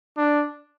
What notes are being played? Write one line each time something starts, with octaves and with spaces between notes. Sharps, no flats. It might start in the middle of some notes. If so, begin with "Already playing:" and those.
D4